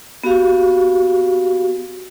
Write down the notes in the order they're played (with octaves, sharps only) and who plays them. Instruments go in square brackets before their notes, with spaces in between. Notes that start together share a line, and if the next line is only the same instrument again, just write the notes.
[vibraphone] B3 F#4 G4 F5